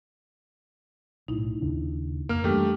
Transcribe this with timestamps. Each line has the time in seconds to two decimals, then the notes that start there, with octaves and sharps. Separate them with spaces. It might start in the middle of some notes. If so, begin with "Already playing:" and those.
1.28 B1 A2 D#4 E4
1.61 D#2 C#3 D4
2.29 F2 A#3 F6
2.44 F#2 E3 G3 A3 A#3 D4 G4